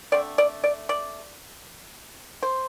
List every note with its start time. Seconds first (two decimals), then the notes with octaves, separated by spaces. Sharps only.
0.12 D3 A3 C4 D5
0.38 D5
0.64 D5
0.89 D5
2.43 C5